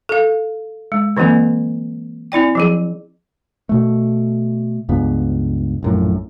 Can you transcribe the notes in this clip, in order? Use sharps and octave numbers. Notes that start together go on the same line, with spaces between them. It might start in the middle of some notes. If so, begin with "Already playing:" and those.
A4 F5
G#3
D3 E3 F#3 A#3 C4
C4 E4 D5 G5
F3 F#3 G#4
B2 A3
C#2 G2 C#3 B3
A#1 F#2 A2